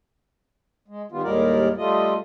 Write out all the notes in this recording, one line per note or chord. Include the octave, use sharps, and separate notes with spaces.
G#3
D#3 G3 B3 F4
D#2 A2 G3 G#3 A#4 D5
G3 A3 F4 D#5